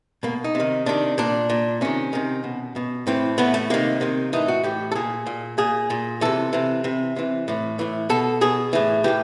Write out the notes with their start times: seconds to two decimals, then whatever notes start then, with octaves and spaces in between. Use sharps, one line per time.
0.23 B2 A#3
0.44 D#4
0.55 C3 D#3
0.86 C3 D#3 D4
1.18 A#2 D4
1.50 A#2
1.81 C3 D#3 C#4
2.13 C3 D#3
2.44 B2
2.76 B2
3.07 A2 E3 C4
3.38 A2 E3 B3
3.54 A3
3.70 C3 D#3 A#3
4.01 C3 D#3
4.33 A2 E3 D#4
4.48 F#4
4.63 A2 E3 G4
4.92 A4
4.96 A#2 G#4
5.27 A#2
5.58 A#2 G#4
5.90 A#2
6.21 C3 E3 A4
6.53 C3 E3
6.84 C3 E3
7.16 C3 E3
7.48 A2 E3
7.79 A2 E3
8.09 B2 A4
8.41 B2 G#4
8.73 A2 E3
9.04 A2 E3 G4